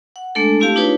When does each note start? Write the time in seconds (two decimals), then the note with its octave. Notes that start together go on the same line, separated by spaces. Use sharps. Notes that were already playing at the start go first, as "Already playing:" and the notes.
0.16 F#5
0.35 G#3 A3 D4 A4
0.60 A3 C4 E4 G4 F5 A5
0.76 D4 D#4 F4 G#4 B4 C#5